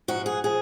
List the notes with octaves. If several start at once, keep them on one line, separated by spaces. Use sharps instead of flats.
G#2 F3 F#4
G#4
F3 G#4